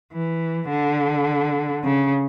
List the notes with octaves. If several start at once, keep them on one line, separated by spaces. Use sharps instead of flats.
E3
D3
C#3